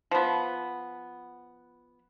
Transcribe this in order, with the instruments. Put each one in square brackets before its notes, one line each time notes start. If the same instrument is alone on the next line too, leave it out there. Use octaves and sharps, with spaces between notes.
[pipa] F3 B3